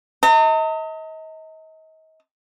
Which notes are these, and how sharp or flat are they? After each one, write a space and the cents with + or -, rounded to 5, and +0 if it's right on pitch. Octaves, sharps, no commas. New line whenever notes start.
D#5 +35 A#5 -45